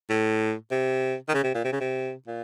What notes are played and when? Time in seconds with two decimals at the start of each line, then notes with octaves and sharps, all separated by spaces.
0.09 A2
0.71 C3
1.28 D#3
1.34 C#3
1.43 C3
1.54 A#2
1.64 C3
1.72 C#3
1.80 C3
2.27 A#2